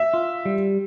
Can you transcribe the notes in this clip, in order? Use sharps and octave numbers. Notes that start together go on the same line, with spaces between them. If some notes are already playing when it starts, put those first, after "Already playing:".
Already playing: E5
F4
G3